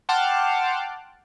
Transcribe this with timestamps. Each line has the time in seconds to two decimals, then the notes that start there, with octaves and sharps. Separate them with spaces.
0.09 F#5 G5 A5 C6 D6 F6